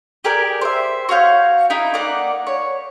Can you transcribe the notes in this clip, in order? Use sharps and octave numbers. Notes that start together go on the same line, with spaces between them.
G4 G#4 A#4 D5
C5 E5
F#4 C#5 F5 G6
D#4 E4 G5
A#3 D#4 D5 F#5
C#5